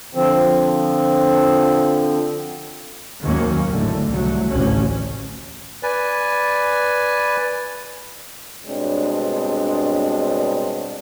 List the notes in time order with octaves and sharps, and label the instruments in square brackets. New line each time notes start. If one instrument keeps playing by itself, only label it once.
[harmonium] D3 F3 C4
[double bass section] D#2 G#2 D#3 F#3 A#3 C#4
G#1 A2 D3
C2 F#3 A3
A1 D2 C3 C#4
[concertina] B4 D5 G#5
[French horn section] G2 B2 G#3 C4 D4 C#5